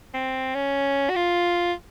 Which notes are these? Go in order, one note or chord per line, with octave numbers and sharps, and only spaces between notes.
C4
C#4
F#4
F4